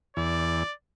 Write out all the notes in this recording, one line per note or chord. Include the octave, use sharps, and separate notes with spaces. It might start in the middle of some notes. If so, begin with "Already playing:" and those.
E2 D5